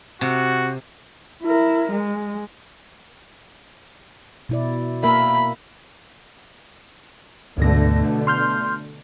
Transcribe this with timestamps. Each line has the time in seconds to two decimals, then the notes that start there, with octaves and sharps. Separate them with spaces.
0.21 C3 F#4
1.43 E4 A#4
1.92 G#3
4.49 B2 E4 D5
5.03 A#3 A#4 E5 B5
7.58 D2 G#2 B2 D3 A3 A#6
8.27 C6 F6 G6